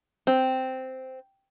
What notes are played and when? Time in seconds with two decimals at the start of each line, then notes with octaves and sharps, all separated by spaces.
0.27 C4